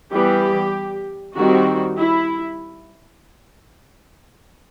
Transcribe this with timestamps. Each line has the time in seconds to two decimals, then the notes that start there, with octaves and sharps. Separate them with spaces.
0.12 E3 G3 B3 G4
1.35 D#3 G3 C4 F#4
1.98 E4